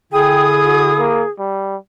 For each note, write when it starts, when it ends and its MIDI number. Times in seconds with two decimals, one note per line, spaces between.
0.13 1.29 50
0.13 1.29 64
0.13 1.30 68
0.13 0.45 79
0.13 1.29 87
0.65 0.92 66
0.98 1.23 58
1.39 1.76 55